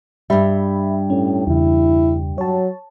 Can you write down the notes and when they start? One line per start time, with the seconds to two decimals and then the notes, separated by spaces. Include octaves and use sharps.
0.30 G2 G3 E5 B5
1.10 A2 C#4
1.47 E2 C#3 E4
2.38 F#3 C#5 A5